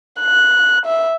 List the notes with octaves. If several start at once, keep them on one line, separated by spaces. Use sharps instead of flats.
F#6
E5